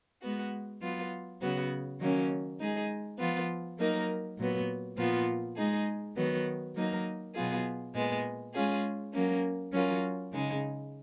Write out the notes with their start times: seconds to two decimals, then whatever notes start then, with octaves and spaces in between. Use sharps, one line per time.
0.22 G#3 B3 F#4
0.81 F#3 B3 F4
1.41 C#3 F#3 B3 F#4
2.00 D#3 F#3 A#3 C#4
2.59 G#3 D#4 G#4
3.19 F3 B3 F4
3.79 F#3 A#3 D#4 A#4
4.37 A#2 F#3 B3
4.97 A#2 F3 B3 F4
5.56 G#3 D#4 G#4
6.16 D#3 F#3 B3
6.75 F#3 A#3 D#4 A#4
7.35 B2 F#3 B3 F4 G#4
7.94 A#2 G#3 B3
8.54 G#3 C#4 F4 G#4
9.13 F#3 A#3 C#4
9.72 F#3 C#4 F4 A#4
10.32 C#3 G#3 D#4